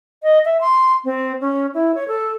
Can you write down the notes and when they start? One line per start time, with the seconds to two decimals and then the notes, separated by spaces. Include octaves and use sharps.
0.23 D#5
0.45 E5
0.61 C6
1.05 C4
1.41 C#4
1.74 E4
1.95 C#5
2.08 A4